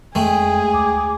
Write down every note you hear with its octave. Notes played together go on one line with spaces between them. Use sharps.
F2 G#3 A3 G#4 G5
D2 D6